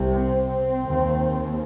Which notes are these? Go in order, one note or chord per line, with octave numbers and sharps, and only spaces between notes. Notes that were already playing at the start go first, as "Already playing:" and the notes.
Already playing: C2 C3
C4
D#2